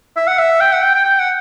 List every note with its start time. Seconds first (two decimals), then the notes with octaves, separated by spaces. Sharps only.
0.17 E5
0.28 F#5
0.39 E5
0.61 G5
0.73 F#5
0.83 G5
0.95 G5
1.05 G5
1.20 F#5